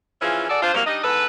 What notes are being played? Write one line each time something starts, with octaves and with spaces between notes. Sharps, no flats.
E3 F3 C#4 E4 F4 G#4
F#4 G#4 A4 D5
D4 F4 C5
C3 E3 F#3 G3 A#3
G3 D4 D#4 D#5
E2 G#2 A4 B4